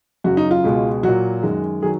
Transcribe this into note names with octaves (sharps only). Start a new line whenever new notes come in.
F#2 C#3 F#3 F#4
D#4
F4
C#2 B2 G#3
A#2 F#3 F#4
F#2 D#3 G#3
D#3 F#3 G#4